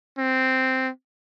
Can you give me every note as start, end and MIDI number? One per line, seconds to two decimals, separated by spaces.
0.18 0.89 60